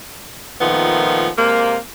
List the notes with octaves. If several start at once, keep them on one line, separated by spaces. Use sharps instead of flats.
A#2 D#3 F3 A3 B3
C3 G#3 A#3